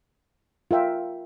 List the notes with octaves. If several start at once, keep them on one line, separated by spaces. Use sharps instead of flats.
F4 A#4 E5 G5